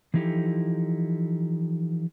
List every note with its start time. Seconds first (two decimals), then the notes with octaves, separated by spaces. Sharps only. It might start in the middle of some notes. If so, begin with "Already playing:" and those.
0.14 E3 F3 D#4 E4 G4 A4